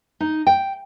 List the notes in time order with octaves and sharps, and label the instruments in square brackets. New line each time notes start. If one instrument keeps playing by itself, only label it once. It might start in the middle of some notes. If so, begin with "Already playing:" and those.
[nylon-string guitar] D#4
G5